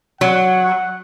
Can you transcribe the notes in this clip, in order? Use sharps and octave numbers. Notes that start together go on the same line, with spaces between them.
F#3 F#5